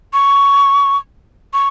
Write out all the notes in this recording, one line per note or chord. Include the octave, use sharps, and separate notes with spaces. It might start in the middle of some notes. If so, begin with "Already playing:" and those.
C#6
C#6